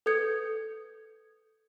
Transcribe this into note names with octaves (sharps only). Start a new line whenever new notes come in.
A4 B4 D#6 G6 G#6 C#7